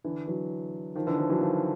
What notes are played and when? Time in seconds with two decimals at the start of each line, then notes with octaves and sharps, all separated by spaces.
0.04 D3 E3
0.28 E3 F#3
0.95 D#3 F3
1.07 D3 E3
1.18 D#3 F3
1.29 E3 F#3
1.41 D#3 F3